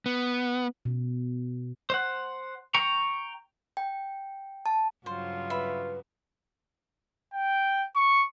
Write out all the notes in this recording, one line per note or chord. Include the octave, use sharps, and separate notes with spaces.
B3
B2
C5 F#5
G5 A#5 C#6
G5
A5
G2 C#3 F#3 F4 C5
B4 E5 B5
G5
C#6